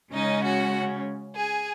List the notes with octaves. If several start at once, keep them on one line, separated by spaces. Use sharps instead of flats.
C#3 G#3 C#4 D#4 D#5
F#4 F#5
G#4 G#5